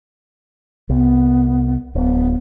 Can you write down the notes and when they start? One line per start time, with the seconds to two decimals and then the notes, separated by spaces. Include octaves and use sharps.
0.89 C2 B3
1.95 D1 B3